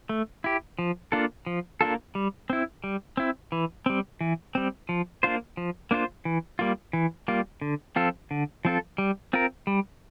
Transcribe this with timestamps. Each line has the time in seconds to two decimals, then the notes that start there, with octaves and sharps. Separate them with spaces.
0.09 A3
0.44 E4 G4
0.79 F3
1.12 A#3 D4 F4 A4
1.46 F3
1.81 A#3 D4 F4 A4
2.15 G3
2.50 C4 E4
2.84 G3
3.17 C4 E4
3.52 E3
3.86 G3 C4
4.21 E3
4.55 G3 C4
4.89 F3
5.23 A#3 D4 F4 C5
5.57 F3
5.91 A#3 D4 F4 C5
6.25 E3
6.59 G3 A#3 F4
6.93 E3
7.28 G3 A#3 F4
7.61 D3
7.96 F3 C4 F4 A4
8.31 D3
8.65 F3 C4 F4 A4
8.98 G3
9.33 C4 F4 A#4
9.67 G3